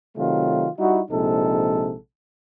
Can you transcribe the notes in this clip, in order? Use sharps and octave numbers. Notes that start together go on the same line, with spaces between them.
C3 D#3 F#3 A3 F4
G3 D#4 E4 F#4
A#1 C3 G#3 D#4 A4